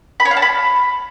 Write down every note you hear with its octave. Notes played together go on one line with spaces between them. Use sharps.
B5
C#5
F5
A5
B5